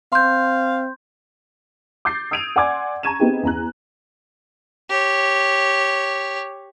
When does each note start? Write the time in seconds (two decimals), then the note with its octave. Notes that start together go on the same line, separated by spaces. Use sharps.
0.13 C4 F5 C6 G6
2.05 D6 G6 A6 C7
2.31 D#6 E6 G#6 D7 D#7 F7
2.56 D5 F#5 G#5 C6 D6 G#6
3.03 A5 A#5 C#6 G#6 D#7 E7
3.19 B3 C4 D#4 G4 G#4
3.43 E2 A#5 F#6
4.90 G4 C#5